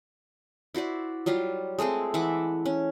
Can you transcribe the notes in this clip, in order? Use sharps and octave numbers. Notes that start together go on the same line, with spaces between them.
E4 F#4 C5 D5
F#3 G3 F4 G4
G#3 A3 C4 G#4
E3 E5 F#5 D6
C#4